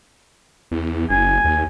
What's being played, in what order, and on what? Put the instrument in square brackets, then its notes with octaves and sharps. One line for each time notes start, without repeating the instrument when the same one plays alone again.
[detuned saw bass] E2
[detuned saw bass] F#1 [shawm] G#5
[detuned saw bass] D#2